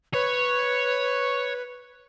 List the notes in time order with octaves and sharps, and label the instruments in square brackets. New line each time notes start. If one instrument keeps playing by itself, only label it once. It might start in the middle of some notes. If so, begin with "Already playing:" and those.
[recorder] B4 [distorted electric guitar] C#5